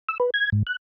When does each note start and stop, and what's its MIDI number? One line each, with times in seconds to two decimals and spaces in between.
0.09 0.18 88
0.20 0.30 71
0.34 0.50 92
0.52 0.63 44
0.67 0.76 90